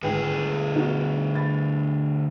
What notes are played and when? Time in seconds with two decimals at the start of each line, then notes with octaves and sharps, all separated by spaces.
0.02 G#1 D2 G#4 B4 G5
0.74 B3 D#4 F#4
1.35 B5 A6